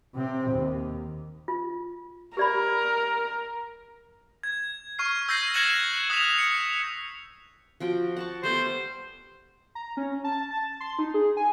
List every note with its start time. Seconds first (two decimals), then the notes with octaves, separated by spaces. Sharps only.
0.15 C3 C4
0.51 D#2
1.48 F4
2.37 G4 A#4 D5 B5
4.43 G#6
4.99 C#6 F6 C7
5.28 E6 G6 G#6 A#6 C7 D#7
5.54 F#6 G#6 A#6 C#7 E7 F#7
6.10 D#6 F#6 B6 F7
6.38 C#7
7.80 F3 F#4 G5
8.17 F#5 A5 C#6
8.43 G3 A3 B3 C5
9.75 A#5
9.97 C#4
10.24 A5
10.51 A5
10.80 C6
10.99 D#4
11.14 G#4
11.37 G#5